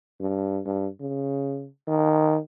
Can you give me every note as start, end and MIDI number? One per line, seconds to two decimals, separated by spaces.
0.20 0.60 43
0.66 0.87 43
1.01 1.67 49
1.87 2.38 51